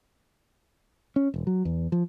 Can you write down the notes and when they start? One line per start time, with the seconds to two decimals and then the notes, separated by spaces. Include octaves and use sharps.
1.16 C#4
1.34 E1
1.47 F#3
1.65 E2
1.92 F3